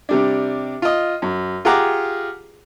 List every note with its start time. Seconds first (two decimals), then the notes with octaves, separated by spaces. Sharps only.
0.09 C3 G3 D4
0.82 F4 D#5
1.22 F#2
1.65 F4 G4 G#4 F#5 A#5 D6